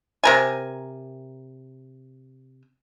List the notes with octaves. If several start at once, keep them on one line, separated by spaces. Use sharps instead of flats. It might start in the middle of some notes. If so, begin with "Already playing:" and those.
C3 A#4 G#5